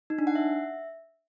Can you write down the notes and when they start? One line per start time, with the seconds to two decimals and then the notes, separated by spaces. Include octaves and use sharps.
0.10 D#4
0.19 D4
0.27 F#5
0.35 E5